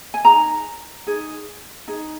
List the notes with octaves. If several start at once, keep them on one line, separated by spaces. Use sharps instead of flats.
G#5
D#4 G#4 A#5
D#4 G#4
D#4 G#4